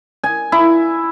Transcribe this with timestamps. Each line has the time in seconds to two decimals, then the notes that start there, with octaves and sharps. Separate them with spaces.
0.24 G#5
0.52 E4